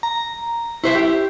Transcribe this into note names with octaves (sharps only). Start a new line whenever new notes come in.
A#5
E4 C5 E5 C#6
G4